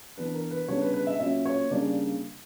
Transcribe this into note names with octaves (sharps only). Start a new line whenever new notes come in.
E3 B3 D4 B4
A#4
B4
C#3 G3 B3 D4 C#5
B4
B4
E5
A#2 F#3 C#4 E5
C#5
C#3 G3 A#3 D4 D5